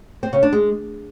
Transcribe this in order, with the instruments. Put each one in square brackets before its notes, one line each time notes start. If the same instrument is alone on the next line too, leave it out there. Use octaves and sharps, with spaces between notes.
[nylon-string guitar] C4
C#3
D4
G#3